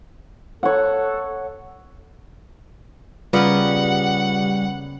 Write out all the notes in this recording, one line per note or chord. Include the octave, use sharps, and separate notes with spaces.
A4 C#5 F#5
C#3 G3 A#3 B3 F4 B4 D5 F#5